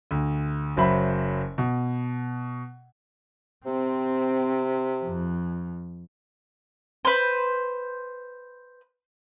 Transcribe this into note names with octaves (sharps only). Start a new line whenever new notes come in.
D2
F#1 F#3 C5 E5 B5
B2
C3 C4
F2
B4 C5